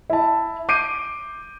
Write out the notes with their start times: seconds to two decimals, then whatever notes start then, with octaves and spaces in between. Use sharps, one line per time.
0.10 E4 A5
0.69 D6 G6 C7 D7 D#7